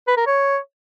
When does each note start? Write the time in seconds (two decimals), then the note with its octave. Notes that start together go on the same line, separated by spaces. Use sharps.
0.08 B4
0.17 A#4
0.27 C#5